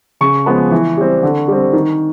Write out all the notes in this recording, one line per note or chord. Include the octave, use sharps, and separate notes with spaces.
C#3 C#6
F3 G#3 B3
E3
G3 C4
D3
G3 C4
D#3